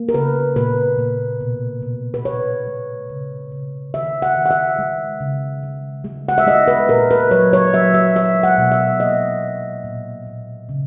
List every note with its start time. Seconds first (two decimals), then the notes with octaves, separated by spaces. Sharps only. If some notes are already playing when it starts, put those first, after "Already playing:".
Already playing: A#3
0.09 A#4
0.14 C#3 B4
0.56 A#2 B4
0.98 A#2
1.41 B2
1.82 B2
2.14 B4
2.25 B2 C#5
2.67 G#3
3.10 C#3
3.52 C#3
3.94 D#3 E5
4.22 F#5
4.37 D#3
4.46 F#5
4.51 E5
4.79 G#3
5.21 C#3
5.63 G#3
6.04 G#3
6.29 F#5
6.38 E5
6.47 G#3 D#5
6.68 B4
6.89 A#2 A#4
7.11 B4
7.31 F#3 C#5
7.53 C#5
7.74 F#3 E5
7.94 E5
8.16 G#3 E5
8.43 F#5
8.58 B2
8.72 E5
9.00 A#3 D#5
9.42 F#3
9.84 A#2
10.27 A#2
10.69 C#3